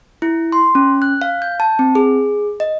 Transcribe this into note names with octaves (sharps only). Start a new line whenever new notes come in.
E4
C6
C#4
F#6
F5
G6
A5
C4
G#4
D#5